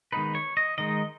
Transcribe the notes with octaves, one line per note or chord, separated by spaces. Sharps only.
D#3 G#3 B3 D#4 B4
C#5
D#5
D#3 G#3 D#4 D#5